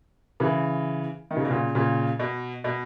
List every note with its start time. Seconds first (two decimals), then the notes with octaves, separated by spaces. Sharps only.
0.40 C#3 E3
1.31 D#3
1.37 C#3
1.45 B2
1.51 A#2 C#3
1.75 A#2 C#3
2.19 B2
2.64 B2